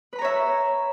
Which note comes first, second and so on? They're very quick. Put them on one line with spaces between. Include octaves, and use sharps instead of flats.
B4 B5 A#5 C#5 E5